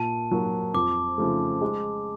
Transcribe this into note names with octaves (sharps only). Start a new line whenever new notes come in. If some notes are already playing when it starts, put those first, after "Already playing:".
Already playing: A#2 A5
F#3 A#3
F2 D6
C#3 F3 A3
G#3